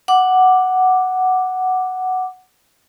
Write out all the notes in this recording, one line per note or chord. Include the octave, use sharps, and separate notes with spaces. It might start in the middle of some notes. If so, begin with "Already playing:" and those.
F#5 D6